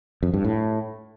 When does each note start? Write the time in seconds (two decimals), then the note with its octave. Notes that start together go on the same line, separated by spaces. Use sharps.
0.23 F2
0.34 G2
0.45 A2